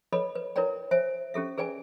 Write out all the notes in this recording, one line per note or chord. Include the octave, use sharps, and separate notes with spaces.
A4 B4 C#5 D#5 B5
B4
E4 A#4 B4 C#5 D5 G5
C5 E5 G#5
C#4 G4 A4 E5
G#4 B4 D5 G5 G#5